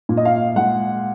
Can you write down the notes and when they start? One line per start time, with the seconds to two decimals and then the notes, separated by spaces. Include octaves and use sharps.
0.09 A#2
0.17 D#5
0.25 F5
0.56 G#3 F#5